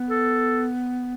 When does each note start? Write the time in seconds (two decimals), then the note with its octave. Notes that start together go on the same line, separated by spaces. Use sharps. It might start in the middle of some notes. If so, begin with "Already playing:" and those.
Already playing: B3
0.10 A4